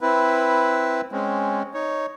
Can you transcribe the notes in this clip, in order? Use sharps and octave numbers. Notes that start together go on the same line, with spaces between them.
C4 E4 B4
G#3 C4 C#4
D#4 C#5